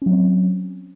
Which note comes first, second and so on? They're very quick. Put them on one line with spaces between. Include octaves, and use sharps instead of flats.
C#4 F#3 C4